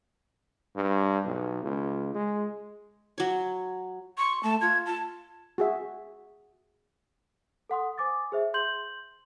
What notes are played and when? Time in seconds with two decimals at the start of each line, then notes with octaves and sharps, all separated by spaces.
0.76 G2
1.25 B1
1.63 C#2
2.15 G#3
3.18 F#3 C#5
4.18 C6 C#6
4.43 A3 A5
4.61 F4 G#6
4.86 A5
5.58 F#4 G#4 E5
7.70 A4 F#5 C6 D#6
7.98 C5 G#5 D6 D#6 A6
8.32 G#4 C5 E5
8.54 C6 G6 F#7